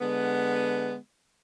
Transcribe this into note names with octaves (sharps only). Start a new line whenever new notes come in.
D3 G#3 B3